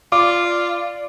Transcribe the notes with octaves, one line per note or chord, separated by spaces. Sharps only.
F4 D5 D6